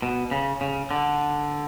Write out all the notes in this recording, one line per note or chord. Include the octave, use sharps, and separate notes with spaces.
B2
C#3
C#3
D3